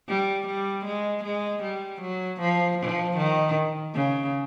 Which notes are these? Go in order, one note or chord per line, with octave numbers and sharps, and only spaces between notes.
G3
G3
G#3
G#3
G3
F#3
F3
F3
D#3
C#3